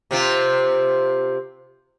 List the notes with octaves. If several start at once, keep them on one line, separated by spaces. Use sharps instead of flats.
C3 C4 F4